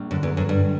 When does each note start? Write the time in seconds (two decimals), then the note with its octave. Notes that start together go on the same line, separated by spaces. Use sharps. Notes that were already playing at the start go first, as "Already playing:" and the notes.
Already playing: A#1 G3 A#3 D4
0.11 F#2 D3
0.23 E2
0.30 F#3
0.37 F#2
0.49 G2 G3